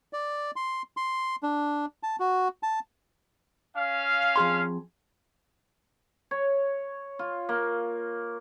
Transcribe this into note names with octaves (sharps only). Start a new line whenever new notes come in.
D5
C6
C6
D4
A5
F#4
A5
C#4 F5
F2 G#4 C6
C#5
F4
A#3